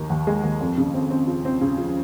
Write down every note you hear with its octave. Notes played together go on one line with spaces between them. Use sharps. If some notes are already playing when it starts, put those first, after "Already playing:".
Already playing: D#2 D#3
D#2
G#3
D#2
F2
C#3
C4
C4
F3
C4
C#3
F3